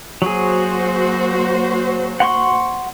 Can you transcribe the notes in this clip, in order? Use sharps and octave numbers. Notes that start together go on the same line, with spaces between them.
F#3 A#3 F#4 G#4 C5
F#5 C6 C#6